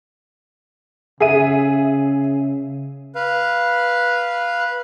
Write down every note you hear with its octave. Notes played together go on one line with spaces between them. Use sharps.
C#3 G#4 E5 D#7
B4 F5